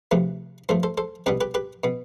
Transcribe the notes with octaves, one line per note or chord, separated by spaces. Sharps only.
D2 C3 F3 A3 G4 B4
G2 F3 A3 A4 C5
A4 C5
A4 C5
C2 B2 G3 B3 G4 B4
G4 B4
G4 B4
B2 B3